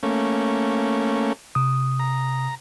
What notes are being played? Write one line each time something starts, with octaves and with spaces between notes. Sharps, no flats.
A3 A#3 C#4
C3 D#6
A#5